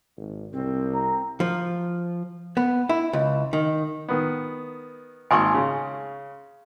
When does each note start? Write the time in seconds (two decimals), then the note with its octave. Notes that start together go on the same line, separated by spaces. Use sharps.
0.17 G#1
0.53 C2 C4
0.94 A#5
1.40 F3
2.57 B3
2.89 E4
3.13 C#2
3.53 D#3
4.09 D#3 B3
5.31 G#1 A#3 G#5 C6 C#6 D#6
5.54 C#3